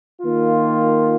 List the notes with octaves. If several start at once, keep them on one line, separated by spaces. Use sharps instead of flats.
D#3 A#3 F4